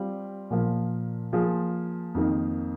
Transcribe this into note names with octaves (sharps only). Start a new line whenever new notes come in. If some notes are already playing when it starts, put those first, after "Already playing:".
Already playing: G3 C4 F4
A#2 F3 A#3
F3 A#3 F4 G#4
F2 D#3 A#3